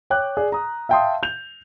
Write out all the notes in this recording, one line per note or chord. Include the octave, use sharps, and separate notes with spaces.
C#5 G5 D6 F#6
G#4 D5
A#5 D#6
E5 F5 G5 A5 C6 D#6
G6 F7